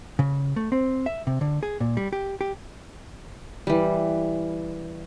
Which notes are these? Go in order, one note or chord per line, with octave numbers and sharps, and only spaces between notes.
C#3
A3
C4
E5
C3
D3
G#4
A#2
G3
G4
G4
E3 G3